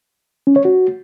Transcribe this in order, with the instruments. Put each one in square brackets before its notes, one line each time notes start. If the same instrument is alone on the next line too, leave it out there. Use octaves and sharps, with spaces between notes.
[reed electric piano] C#4
C#5
F#4